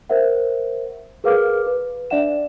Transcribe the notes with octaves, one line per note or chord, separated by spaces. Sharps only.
A#4 C5 E5 F#5
G#4 A#4 B4 F5 D6 F6
B4
D4 D5 E5 F#5 E7